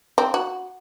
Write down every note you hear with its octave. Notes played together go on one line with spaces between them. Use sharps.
C4
F#4